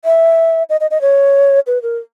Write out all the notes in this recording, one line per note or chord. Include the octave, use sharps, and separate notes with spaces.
E5
D#5
D#5
D#5
C#5
B4
A#4